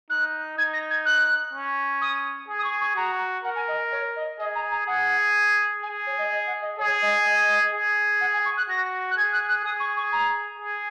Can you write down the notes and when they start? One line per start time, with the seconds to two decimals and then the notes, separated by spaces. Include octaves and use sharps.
0.10 D#4 F#6
0.58 D#4 G#6
0.73 A#6
0.90 G#6
1.05 F#6
1.54 C#4
2.01 D#6
2.48 G#4
2.59 D#6
2.64 C#6
2.81 C#6
2.96 F#4 A#5
3.44 A#4 F#5
3.55 G#5
3.68 D#5
3.92 C#5
4.16 D#5
4.39 G#4 D#5
4.55 A#5
4.71 A#5
4.87 G#4 F#5
5.83 G#4 G#5
6.07 C#5
6.18 D#5
6.30 D#5
6.47 F#5
6.62 D#5
6.78 G#4 C#5
7.02 D#5
7.25 D#5
7.74 G#4
8.21 F#5
8.34 G#5
8.45 C#6
8.57 F#6
8.69 F#4 A#6
9.10 F#6
9.17 G#4 G#6
9.33 F#6
9.48 F#6
9.64 G#4 D#6
9.80 C#6
9.97 C#6
10.12 A#5
10.60 G#4